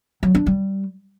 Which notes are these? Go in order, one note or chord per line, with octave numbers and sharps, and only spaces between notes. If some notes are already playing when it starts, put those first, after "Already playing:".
F#3
D4
G3